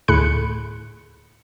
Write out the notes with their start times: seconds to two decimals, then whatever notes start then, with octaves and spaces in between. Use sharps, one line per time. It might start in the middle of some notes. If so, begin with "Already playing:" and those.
0.08 D2 A2 G#4 B5 F#6 C#7